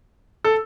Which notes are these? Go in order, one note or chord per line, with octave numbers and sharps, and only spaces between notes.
A4